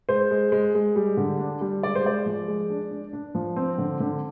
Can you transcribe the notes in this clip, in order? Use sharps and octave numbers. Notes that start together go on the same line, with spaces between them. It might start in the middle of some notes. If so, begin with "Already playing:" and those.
G#3 C5
G#3
G#3
G#3
G3
D3
D4
G3
G#3 D5
C5
G#3 D5
F3
G#3
D4
D4
D4
F3
C4
D3
D3